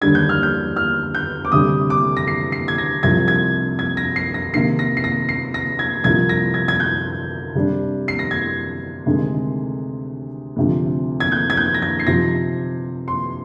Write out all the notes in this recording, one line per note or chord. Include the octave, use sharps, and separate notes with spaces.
D#2 D3 G3 D4 G#6
G6
F6
G6
F6
G6
D6
D2 C3 G3 D#6
D6
A#6
C7
C7
G#6
A#6
C2 C3 F3 G#6
G#6
G#6
A#6
C7
A#6
C3 D#3 A#3 C7
A#6
C7
A#6
C7
A#6
G#6
C2 C3 F3 G#6
A#6
G#6
G#6
G6
C3 G3 D4
C7
A#6
G#6
D2 C3 D#3 G#3
D2 C3 F3
G#6
G6
G#6
G6
A#6
G#6
C7
C3 F3 C4 D#4 A#6
C6